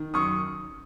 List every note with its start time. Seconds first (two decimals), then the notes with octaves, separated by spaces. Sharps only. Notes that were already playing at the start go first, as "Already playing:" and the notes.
Already playing: D#3
0.14 F#2 C#6 D#6